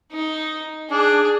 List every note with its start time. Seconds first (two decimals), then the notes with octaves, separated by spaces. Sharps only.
0.12 D#4
0.91 D4 G#4